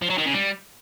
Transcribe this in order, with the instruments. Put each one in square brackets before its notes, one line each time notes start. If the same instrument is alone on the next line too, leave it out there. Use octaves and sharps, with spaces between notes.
[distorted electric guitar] F3
F#3
D#3
C#3
G3